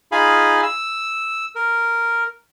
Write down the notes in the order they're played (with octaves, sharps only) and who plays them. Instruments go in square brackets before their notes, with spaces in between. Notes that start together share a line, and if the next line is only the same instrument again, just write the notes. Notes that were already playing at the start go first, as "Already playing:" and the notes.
[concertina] D#4 F4 G#4 F5 G#5 B5
E6
A#4